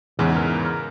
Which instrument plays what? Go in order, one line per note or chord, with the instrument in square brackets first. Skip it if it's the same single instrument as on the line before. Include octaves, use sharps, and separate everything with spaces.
[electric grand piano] E2 G#2 C#3 [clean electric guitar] E3
[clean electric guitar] A#4